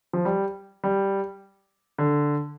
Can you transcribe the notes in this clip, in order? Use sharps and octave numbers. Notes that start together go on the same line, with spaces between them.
F3
G3
G3
D3